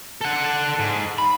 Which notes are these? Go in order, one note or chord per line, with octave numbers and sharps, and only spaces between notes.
A4 F#5
G#2
B5